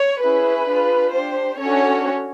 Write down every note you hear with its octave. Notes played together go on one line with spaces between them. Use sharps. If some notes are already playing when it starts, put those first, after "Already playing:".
Already playing: C#5
C#4 E4 G#4 B4
D4 F4 G#4
D4 G4 C5
C#4 D4 F#4 A4 C#5